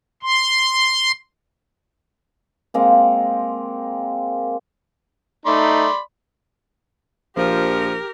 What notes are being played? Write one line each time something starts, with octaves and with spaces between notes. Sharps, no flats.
C6
G#3 A#3 C4
A3 D#4 D5 B5 C6
A#1 F3 G4 A#4